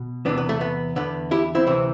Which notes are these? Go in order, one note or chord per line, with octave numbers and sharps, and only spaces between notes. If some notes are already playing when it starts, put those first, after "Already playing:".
Already playing: B2
E2 C3 E3 B3 D4
B3
A3
B3
E2 D3 B3
E4 G4
C4 E4
D2 C3 E3 C4 E4